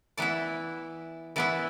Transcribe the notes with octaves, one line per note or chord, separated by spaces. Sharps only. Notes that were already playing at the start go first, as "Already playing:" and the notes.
E3 B3 E4 D5
E3 B3 E4 D5